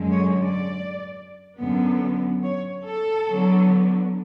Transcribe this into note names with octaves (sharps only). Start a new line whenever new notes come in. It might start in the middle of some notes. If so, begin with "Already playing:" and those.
Already playing: F#2 D3 G#3
C#5
D5
F#2 D3 F#3 B3
C#5
A4
D3 F#3 B3 D4